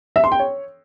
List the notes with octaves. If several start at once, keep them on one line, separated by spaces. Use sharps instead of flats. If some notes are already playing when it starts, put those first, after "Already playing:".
E5
C6
G5
C#5